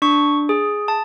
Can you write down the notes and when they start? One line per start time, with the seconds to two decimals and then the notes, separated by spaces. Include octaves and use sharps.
0.02 D4 C#6
0.49 G#4
0.88 A5